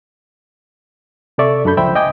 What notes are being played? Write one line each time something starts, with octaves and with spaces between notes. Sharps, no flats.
C3 A4 D5 E5 C#6
F#2 D4 A4 B5 G6
C#2 F3 C5 E5 G5 B5
D#5 G5 G#5 D6 D#6 G6